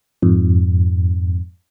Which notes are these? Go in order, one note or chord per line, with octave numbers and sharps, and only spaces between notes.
F2 G#2